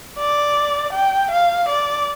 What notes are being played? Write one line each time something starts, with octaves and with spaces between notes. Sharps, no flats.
D5
G5
F5
D5